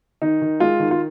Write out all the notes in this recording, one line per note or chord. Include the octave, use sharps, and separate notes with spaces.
D#3 D#4
D#3
G#3 F4
D#3
F4